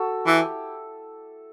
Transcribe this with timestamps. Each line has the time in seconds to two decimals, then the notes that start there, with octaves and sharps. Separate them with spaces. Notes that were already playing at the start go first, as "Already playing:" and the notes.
Already playing: F#4 A4
0.26 E3 E4 G4